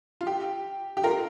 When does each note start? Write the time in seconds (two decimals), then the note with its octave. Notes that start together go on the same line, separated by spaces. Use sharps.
0.21 F4
0.27 G4
0.97 G4
1.04 F4 A#4